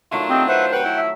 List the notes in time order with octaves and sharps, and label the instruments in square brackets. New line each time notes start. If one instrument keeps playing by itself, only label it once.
[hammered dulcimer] D#3 F#3 A3 [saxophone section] D4 E4 F4
[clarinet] C4 [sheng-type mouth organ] G4 D#5
[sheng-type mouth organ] B4 E5 F#5 [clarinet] C5
[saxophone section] C3 B4 [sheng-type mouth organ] F#5 G5
[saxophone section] F3 E4
[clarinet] E5